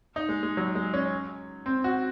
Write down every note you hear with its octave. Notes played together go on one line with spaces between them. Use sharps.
D#4
G#3
G#3
F#3
G#3
C#4
C4
F#4